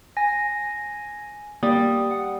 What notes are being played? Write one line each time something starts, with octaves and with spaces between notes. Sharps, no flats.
G#5 A#6
G3 A#3 D#6
F#5